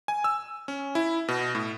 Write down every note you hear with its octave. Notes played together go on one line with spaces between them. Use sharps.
G#5
E6
C#4
E4
B2
A2